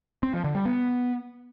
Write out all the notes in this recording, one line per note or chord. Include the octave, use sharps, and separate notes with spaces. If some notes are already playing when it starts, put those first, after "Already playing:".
C4
F3
D3
G3
B3